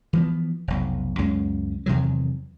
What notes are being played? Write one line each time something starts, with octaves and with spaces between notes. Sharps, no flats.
E3 F3 B3
F1 B1
C#2 F#2 G#3 C#4
E2 C3 D#3 F#3